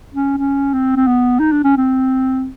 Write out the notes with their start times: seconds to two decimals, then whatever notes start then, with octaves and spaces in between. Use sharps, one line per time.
0.14 C#4
0.38 C#4
0.73 C4
0.96 C4
1.07 B3
1.39 D#4
1.52 D4
1.64 C#4
1.77 C4